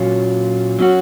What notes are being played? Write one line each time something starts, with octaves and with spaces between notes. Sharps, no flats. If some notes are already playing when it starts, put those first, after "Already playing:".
Already playing: A#2 F#3 C#4 F4
F#3 C#4 F#4